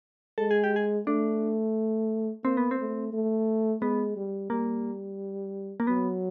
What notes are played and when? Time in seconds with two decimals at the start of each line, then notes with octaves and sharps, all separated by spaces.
0.38 G#3 A4
0.51 G#4
0.64 G4
0.76 G#4
1.07 A3 D4
2.44 A#3 C4
2.57 B3
2.71 C4
2.79 A3
3.13 A3
3.82 G#3 B3
4.16 G3
4.50 G3 A#3
5.80 A#3
5.87 F#3 B3